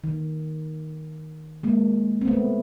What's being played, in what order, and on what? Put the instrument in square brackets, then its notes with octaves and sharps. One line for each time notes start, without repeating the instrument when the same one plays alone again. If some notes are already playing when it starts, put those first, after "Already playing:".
[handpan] D#3
G#3 A#3
C4
A3 B3